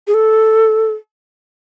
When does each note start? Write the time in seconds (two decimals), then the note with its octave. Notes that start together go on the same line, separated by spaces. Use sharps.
0.07 G#4
0.14 A4